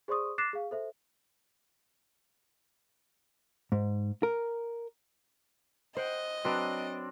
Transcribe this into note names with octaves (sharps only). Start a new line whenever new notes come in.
G#4 C5 D5 C6 C#6 D#6
D6 F#6 A6 A#6 C7 E7
G#4 F5
A4 C5 E5
G#2
A#4
C5 D#5 F#5 G5
F#3 C4 D4 B4